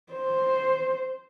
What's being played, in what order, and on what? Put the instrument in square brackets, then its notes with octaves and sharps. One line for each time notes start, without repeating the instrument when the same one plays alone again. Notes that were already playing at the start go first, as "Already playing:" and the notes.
[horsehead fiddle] C5